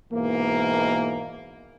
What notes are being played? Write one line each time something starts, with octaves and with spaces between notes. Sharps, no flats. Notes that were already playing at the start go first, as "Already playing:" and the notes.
G#2 B2 E3 A#3